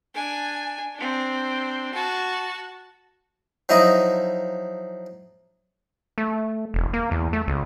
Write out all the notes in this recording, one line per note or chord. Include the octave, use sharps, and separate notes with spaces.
D4 G#5
C4 D4
F#4 A5
F3 F#3 D#4 E4 D#5
A3
E1
A#3
E2
A3
C#2